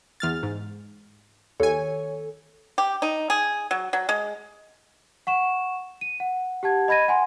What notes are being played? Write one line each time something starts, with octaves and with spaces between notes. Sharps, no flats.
E2 F6 A6
G#2
D#2 A4 C#5 G#5
G4
D#4
G#4
F#3
F#3
G#3
F#5 C#6 E7
D#7
F#5
G4 F#5 A5 G#6
D#5 B5 G#6 A#6 D#7
F#5 G#5 C6